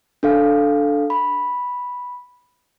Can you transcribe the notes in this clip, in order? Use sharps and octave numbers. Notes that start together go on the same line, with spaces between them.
D4 A4 F5
B5